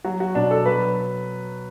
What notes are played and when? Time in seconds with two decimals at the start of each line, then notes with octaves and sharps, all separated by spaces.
0.04 F#3 F#4
0.20 F#4
0.35 B2 D4
0.51 A4
0.66 F#3 B4